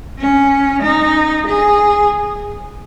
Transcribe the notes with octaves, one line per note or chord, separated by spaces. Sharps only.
C#4
D#4
G#4